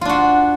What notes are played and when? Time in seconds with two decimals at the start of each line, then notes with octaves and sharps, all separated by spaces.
0.01 F4
0.05 D4
0.09 F#4